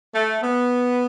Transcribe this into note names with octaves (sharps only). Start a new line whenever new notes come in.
A3
B3